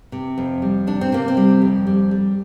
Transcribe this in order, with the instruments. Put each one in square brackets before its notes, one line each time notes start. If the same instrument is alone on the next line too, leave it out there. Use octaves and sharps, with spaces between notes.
[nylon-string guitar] C3
F2
G3
C3 D4
C4
C3 A#3
C4
G3
F2
G3
G3